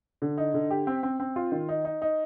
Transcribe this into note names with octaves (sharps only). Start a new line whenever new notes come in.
D3
D#4
D3
G4
C4
C4
C4
F4
D#3
D#4
D#4
D#4